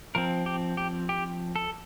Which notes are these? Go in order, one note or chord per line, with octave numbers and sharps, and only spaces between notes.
F3 C4 A#4
G4
G4
G4
A4